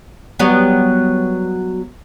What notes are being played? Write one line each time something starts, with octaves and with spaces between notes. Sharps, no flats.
F#3 G3 B3